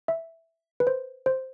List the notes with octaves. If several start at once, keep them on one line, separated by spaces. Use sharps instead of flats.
E5
B4
C5
C5